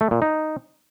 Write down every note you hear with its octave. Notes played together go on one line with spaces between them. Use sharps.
A3
A#2
D#4